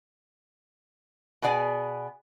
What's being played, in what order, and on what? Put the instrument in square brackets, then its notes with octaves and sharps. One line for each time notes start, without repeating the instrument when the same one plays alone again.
[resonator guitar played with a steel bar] B2 B3 G#4 D5 G#5